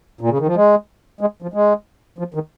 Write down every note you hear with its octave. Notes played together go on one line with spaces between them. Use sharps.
A#2
C#3
D#3
F3
G#3
G#3
F3
G#3
F3
D#3